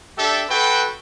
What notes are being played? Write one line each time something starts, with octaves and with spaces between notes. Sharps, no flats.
D4 G4 A4 E5
F#4 A4 B4 G5